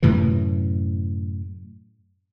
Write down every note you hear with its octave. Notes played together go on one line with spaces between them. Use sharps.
F#2 A2 C3 E3